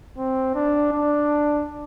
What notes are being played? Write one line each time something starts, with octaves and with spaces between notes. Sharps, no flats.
C4
D4
D4